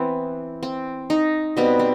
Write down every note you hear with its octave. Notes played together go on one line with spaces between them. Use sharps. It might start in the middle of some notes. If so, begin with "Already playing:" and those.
Already playing: E3 B3 C4
C4
D#4
B2 G3 B3 C4
C4